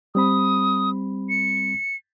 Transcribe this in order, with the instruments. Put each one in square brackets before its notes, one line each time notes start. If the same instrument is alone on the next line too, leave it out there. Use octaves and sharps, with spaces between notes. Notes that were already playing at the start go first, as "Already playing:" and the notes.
[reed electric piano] G3 C4 B5 [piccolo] D#6
[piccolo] C#7